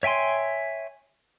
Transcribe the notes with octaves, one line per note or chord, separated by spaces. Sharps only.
C#5 E5 G5 G#5 C6